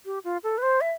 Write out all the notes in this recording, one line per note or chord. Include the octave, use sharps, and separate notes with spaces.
G4
F4
A4
B4
C5
E5